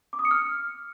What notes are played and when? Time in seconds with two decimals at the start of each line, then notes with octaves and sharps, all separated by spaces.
0.13 D6
0.19 D#6
0.25 C#7
0.31 F6